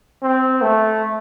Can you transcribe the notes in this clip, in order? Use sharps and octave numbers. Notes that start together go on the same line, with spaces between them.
C4
A3